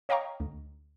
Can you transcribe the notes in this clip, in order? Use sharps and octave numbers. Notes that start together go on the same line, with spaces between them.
C#5 D#5 F5 G5 A#5 C#6
D2